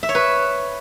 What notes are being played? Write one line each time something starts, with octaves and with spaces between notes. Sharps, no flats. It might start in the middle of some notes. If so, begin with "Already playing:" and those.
E5
C#5
B4